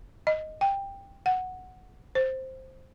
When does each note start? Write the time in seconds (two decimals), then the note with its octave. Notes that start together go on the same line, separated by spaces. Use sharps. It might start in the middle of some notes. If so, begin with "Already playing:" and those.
0.27 D#5
0.61 G5
1.26 F#5
2.15 C5